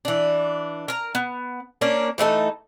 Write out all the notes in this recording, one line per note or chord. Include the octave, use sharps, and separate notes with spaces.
E3 D4
A#4 A#5
B3
A#3 C#4 D4 A#4
E3 A3 D#4 A4